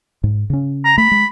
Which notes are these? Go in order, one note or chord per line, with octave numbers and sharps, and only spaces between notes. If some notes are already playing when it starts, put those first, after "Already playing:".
G#2
C#3 C#4
A#5
A3 B5
G#3